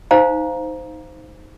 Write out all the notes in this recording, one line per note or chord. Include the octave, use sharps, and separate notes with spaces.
D#4 C5 F5 A#5